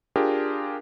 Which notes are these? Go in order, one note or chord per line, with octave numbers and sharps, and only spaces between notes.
D4 F4 G4 G#4 A#4